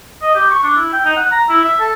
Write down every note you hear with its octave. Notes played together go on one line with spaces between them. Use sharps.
D#5
G4
C#6
D4
E4
G5
D#4
F#5
A#5
E4
E5
A4